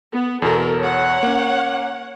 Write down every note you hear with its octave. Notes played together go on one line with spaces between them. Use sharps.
B3
E2 B2 A4 A#4
C#5 F#5
A#3 C#4